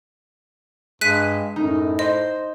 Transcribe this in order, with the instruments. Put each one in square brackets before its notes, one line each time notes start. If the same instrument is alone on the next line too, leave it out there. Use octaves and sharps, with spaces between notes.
[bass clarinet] G2 [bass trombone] G#3 [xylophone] F#6 B6 D#7
[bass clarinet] F#2 [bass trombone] A2 [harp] D#4
[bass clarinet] C5 [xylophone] D#5